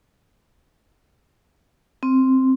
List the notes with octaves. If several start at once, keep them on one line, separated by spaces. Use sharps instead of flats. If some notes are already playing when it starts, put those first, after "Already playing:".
C4